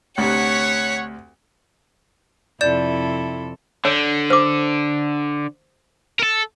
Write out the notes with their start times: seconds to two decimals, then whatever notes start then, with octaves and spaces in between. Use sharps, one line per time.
0.18 D2 C3 C#5 F#5 B6 C#7
2.61 F2 C3 E4 A4 D5 G6 E7
3.85 D3 C#5
4.30 C5 D6
6.19 A4 A#4